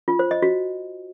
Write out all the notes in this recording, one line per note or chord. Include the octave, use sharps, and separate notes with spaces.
F4
C5
D#5
F#4